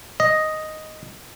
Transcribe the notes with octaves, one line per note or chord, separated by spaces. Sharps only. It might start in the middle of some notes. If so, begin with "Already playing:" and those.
D#5